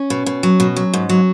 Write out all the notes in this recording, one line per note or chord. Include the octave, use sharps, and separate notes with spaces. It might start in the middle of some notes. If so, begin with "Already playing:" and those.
Already playing: C#4
B2
B2
F#3
B2
F#3
G#2
F#3